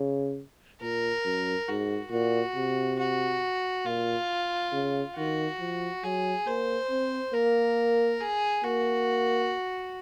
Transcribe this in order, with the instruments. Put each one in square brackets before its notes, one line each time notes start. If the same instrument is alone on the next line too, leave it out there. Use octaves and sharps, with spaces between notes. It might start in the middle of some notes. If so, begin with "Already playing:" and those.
Already playing: [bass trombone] C#3
[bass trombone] A#2 [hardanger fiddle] A#4
[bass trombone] F#2
[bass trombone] G#2 [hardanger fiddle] F#4
[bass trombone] A#2 [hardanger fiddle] F#4
[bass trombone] C3
[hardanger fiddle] F#4
[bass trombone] A#2 [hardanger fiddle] F4
[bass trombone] C#3
[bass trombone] D#3 [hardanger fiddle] F#4
[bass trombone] F3
[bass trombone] F#3 [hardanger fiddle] G#4
[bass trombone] A#3 [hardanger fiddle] C5
[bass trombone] C4
[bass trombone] A#3 [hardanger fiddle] A#4
[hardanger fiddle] G#4
[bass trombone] A#3 [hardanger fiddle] F#4